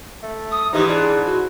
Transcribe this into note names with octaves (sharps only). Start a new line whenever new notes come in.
A3
D#6
G#2 E3 D#4 G4
D4 G#4
F#4